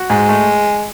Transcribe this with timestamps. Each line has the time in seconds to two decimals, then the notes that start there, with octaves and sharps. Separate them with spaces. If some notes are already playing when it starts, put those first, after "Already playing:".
Already playing: F#4
0.10 G#2 G#3
0.29 A3